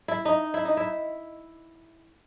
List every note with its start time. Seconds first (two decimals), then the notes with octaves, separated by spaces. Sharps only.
0.08 E4
0.25 D#4
0.54 E4
0.65 D#4
0.77 E4